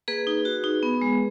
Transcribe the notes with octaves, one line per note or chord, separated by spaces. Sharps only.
A#3 G#4 B4
D#4
F#4
D#4
B3
G#3